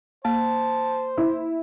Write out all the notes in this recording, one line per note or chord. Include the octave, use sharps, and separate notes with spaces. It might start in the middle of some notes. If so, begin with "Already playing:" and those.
A#3 C5 A5
E4